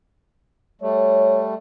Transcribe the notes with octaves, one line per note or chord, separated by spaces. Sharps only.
G3 A3 C#5